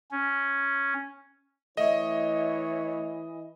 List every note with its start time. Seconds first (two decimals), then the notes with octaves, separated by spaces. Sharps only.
0.11 C#4
1.77 E3 A3 C#5 D#5